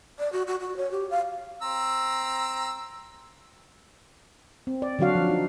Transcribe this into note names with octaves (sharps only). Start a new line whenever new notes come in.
D5
F#4
F#4
F#4
C#5
G4
F5
C4 A#5 E6
C4
D5
D3 F#3 D4 F#4 F5
F3
D#4